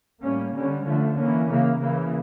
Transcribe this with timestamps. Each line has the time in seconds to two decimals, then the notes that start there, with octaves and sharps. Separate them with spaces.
0.22 A2 G3 A#3 C#4
0.53 D3 G3 C#4
0.85 D3 F3 A3
1.16 E3 A#3 C#4
1.48 C#3 E3 A#3
1.80 C#3 E3 A#3